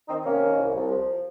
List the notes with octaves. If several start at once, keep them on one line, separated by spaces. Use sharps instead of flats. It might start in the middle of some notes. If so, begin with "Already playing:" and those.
D#3 C4 D#4
C3 A#3 C#4
D#3
C2
C2
F3